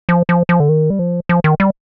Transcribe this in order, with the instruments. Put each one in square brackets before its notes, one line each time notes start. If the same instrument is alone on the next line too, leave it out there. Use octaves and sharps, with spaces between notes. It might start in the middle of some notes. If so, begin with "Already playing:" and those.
[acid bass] F3
F3
F3
D3
D#3
G3
F3
F3
D#3
G3